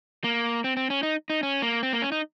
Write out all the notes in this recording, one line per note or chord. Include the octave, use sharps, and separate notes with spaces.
A#3
C4
C4
C#4
D#4
D#4
C#4
A#3
C4
A#3
C#4
D#4